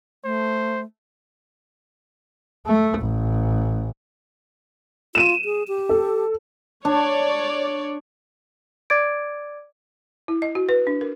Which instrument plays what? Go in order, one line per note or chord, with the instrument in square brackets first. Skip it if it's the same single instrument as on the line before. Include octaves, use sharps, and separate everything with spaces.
[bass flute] A3 [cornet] C5
[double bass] A3
A1
[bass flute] F4 [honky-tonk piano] D#7 E7
[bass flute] G#4
G4
[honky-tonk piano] A4
[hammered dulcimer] D4 [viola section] C#5 D5
[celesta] D5 D6 G#6 A6 D7
[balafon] E4
D#5
F#4
B4
D4
A#4